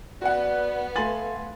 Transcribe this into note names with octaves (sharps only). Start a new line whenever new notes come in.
B3 F#4 D5 F#5
A3 F5 G#5 C6 A6 F#7